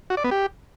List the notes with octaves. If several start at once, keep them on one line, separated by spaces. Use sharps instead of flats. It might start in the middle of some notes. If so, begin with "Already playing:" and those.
F#4
D5
B3
G4